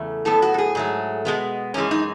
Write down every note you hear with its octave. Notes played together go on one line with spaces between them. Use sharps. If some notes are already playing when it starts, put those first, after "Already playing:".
Already playing: E2 C#3 A3
A2 F#3 B3 A4
F#4
A4
G#4
G#2 F#3 A3
B2 G#3 B3
F#2 E3 G#3 C#4
D#4